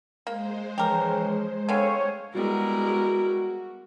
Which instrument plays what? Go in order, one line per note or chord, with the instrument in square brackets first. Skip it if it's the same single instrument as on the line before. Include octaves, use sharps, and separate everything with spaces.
[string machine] G#3 C5 [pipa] A#3
[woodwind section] C#3 E3 F3 [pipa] G4 A#4
[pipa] D3 B3 C4 [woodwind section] A4 F5 G#5 [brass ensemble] C#5
[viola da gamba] G3 E4 A#4 [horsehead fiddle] G#3 B3 [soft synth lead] F#4